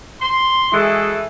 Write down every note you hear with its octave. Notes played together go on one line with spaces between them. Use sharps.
C6
E3 G#3 E4 F#4 G#4 A4